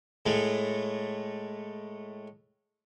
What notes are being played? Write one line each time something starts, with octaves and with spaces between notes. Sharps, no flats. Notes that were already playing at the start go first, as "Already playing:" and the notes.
A2 G#3 A3